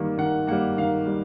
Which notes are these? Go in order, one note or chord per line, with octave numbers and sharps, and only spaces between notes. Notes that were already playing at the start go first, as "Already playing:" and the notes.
Already playing: D#3 G3 A#3
D#3 F#5
G3 A#3 F#5
D#3 F5
G3